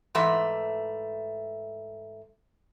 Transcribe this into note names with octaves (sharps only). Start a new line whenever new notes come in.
G#2 E3 A3 E5